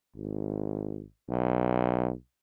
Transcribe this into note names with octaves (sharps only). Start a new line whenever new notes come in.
G#1
B1